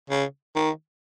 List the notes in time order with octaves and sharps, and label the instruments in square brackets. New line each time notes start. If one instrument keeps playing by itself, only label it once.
[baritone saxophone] C#3
D#3